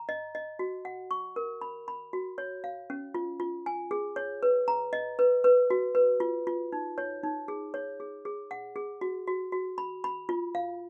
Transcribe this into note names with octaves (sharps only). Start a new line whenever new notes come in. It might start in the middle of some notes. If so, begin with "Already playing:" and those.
Already playing: A#5
D#5
D#5
F#4
F#5
C#6
A#4
B5
B5
F#4
C#5
F5
C#4
F4
F4
G#5
G#4
C#5
B4
A#5
D#5
B4
B4
F#4
B4
F4
F4
D#4
C#5
D#4
G#4
C#5
G#4
G#4
F#5
G#4
F#4
F#4
F#4
B5
B5
F4
F5